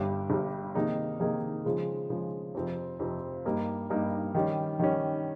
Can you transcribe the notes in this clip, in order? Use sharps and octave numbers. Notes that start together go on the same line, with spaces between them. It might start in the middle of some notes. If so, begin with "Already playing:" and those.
Already playing: G1 G2 G3
G1 G2 G3
C3 D#3 A#3 D#4 G#4
C3 D#3 A#3 D#4 G#4
C#3 F3 G#3
C#3 F3 G#3
F2 C3 F3 C4
F2 C3 F3 C4
G2 G3 A#3 D#4
G2 G3 A#3 D#4
D#3 G3 C#4
D#3 G3 C#4